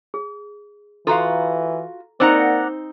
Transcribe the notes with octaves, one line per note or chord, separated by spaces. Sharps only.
G#4
E3 F4 F#4 A4 F5 A#5
A#3 C4 D#4 C5 D5 D#5 F#5 A#5